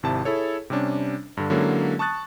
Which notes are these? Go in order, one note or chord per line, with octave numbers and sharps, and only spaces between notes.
G#1 C3 E4 A5
E4 G#4 A4 C#5
C3 G3 C#4 D4
G2 D3
D3 F#3 G#3 A#3 C#4 E4
A5 C#6 D#6 F#6 A6